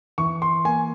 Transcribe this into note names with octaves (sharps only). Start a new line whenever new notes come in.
E3 C#6
C6
A#3 G#5